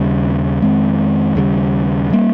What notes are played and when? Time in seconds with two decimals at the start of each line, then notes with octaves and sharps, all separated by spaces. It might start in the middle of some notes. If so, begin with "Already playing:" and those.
Already playing: D#2 C#3 G3
0.62 F2 D#3 G#3 C4
1.35 D#2 C#3 G3
2.10 C3
2.13 G3 A#3